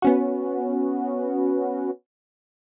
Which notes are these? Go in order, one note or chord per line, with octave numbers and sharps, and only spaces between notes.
B3 C#4 F#4